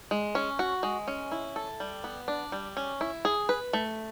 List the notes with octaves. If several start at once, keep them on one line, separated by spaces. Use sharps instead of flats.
G#3
C#4
F#4
G#3
C#4
E4
A4
G3
B3
D4
G3
C#4
E4
G#4
B4
A3